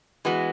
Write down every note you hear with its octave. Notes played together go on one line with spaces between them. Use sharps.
E3 G#3 B3 F#4